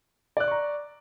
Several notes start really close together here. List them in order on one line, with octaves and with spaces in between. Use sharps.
D5 F#6 D6 C#6 A#5